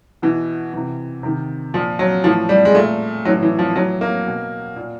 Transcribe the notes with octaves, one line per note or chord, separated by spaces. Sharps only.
B2 E3
C3 E3
C3 D#3
A#2 F3
F#3
A2 E3 F3
G3
G#3
A#2 A3
A2 E3 F#3
E3
F3
A2 E3 F#3
A#3
B2
A#2